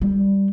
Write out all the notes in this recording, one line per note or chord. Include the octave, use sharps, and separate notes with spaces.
G3